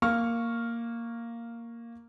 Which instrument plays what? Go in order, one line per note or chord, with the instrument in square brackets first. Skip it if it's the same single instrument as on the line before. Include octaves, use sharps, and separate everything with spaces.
[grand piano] A#3 C#6 F6